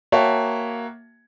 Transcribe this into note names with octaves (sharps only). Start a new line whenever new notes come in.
A#3 F#4 C#5 E5 G5 A5